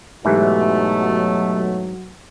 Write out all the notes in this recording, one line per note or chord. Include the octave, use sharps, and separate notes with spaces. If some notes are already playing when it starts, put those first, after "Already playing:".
G#2 B2 E3 F#3 A3 G4 E5